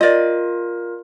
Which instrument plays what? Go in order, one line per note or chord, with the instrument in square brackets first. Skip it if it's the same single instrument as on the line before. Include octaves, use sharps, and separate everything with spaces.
[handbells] F4 A#4 [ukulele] D5 D#5